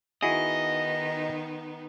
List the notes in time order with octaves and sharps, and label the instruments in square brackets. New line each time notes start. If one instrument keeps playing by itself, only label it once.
[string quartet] D#3 B3 D#4 [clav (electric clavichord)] E4 F#4 G#4 [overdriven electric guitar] D#5